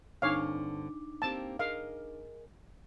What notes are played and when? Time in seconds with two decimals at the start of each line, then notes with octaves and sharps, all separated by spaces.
0.22 G2 D3 C4 D4 D#4 C#5 F5 D6
1.22 A#3 C4 G4 A5
1.59 G#4 A#4 D#5 F5